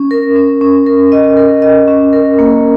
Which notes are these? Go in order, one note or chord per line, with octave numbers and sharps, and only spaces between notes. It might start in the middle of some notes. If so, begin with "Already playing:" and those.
Already playing: C#4
A#4
C#4
C#4
A#4
D#5
A#4
D#5
C#4
A#4
A#3